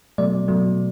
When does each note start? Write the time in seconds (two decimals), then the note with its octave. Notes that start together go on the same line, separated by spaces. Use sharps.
0.18 B2 F#3 A3 D5
0.48 B2 F#3 A3